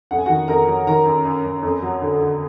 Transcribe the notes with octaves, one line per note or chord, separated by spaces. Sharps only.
F2 F#5
G#5
F#4 F#5
D#3
F2 A#4 A#5
F#3
D#3 A#4 A#5
F#2
F#2
F#2
F2
F#3
D3
D3